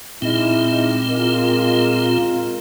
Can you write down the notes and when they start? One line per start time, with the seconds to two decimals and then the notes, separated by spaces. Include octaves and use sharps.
0.22 A#2 G#3 C4 D#4 E4
1.08 G#3 F4 A#4